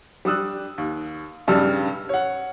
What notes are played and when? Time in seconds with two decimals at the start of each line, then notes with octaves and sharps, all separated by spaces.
0.25 G3 D4 D#6 E6 F#6
0.78 D#2
1.47 B1 G2 C#3 G3 E6 F6
2.09 C#5 F#5